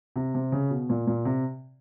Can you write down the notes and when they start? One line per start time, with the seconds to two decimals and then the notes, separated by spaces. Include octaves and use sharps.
0.16 C3
0.34 C3
0.52 C#3
0.70 B2
0.89 A#2
1.07 A#2
1.25 C3